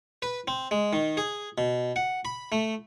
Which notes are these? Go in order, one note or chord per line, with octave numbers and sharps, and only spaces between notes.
B4
C4
G#3
D#3
G#4
B2
F#5
B5
A3